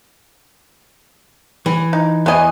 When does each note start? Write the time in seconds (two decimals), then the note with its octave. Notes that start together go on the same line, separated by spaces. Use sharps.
1.66 E3
1.93 D#4
2.26 E2 E3 D#5 G#5